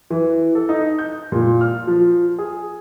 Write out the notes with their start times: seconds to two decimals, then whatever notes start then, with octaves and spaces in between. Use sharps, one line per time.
0.10 E3
0.55 A4
0.69 D#4
0.99 G6
1.32 A#2
1.61 F6
1.87 F3
2.38 G#4